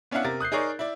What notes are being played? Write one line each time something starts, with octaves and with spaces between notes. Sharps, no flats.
B3 C#4 D4 E4 F5 F#5
C3 A#4 A6
D#6 F#6 G6 C7
D#4 G#4 A#4 C#5 D5
E4 D5